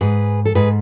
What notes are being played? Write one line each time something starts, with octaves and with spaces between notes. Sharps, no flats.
G#2 G#4 B4
A4
G#2 G#4 B4